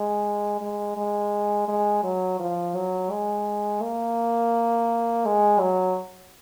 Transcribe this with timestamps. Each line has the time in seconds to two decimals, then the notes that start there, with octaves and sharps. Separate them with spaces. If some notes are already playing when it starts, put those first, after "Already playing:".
Already playing: G#3
0.61 G#3
0.97 G#3
1.68 G#3
2.04 F#3
2.39 F3
2.75 F#3
3.11 G#3
3.82 A#3
5.25 G#3
5.60 F#3